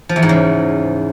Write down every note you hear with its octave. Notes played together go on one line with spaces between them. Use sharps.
F3
E2
G#2
C#3